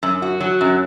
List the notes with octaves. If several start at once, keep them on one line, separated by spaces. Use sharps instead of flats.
F#2
F#4
F#3
F#2